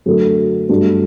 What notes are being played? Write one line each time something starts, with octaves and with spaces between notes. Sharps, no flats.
F#2 D3 F#3 A3
G2 F#3 A3 D4